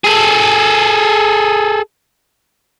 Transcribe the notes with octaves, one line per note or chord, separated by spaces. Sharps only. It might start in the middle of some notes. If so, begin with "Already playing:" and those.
G#4 A4